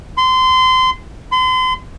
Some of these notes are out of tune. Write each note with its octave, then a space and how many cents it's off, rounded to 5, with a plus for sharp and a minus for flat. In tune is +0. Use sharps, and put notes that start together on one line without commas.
C6 -25
C6 -40